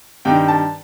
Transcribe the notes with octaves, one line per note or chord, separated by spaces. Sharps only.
G2 D#3 G5
A5